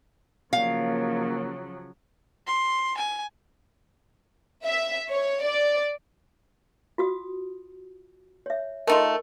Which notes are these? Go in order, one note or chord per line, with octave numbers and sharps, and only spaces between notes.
C#3 F3 F#3 A#3 F5
C6
G#5
E5
C#5
D5
F4 F#4 D#6
C#5 E5
A3 D#4 F4 A#4